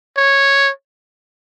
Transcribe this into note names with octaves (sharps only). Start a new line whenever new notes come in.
C#5